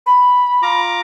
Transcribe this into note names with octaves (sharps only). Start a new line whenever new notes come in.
B5
F4 A#5 D6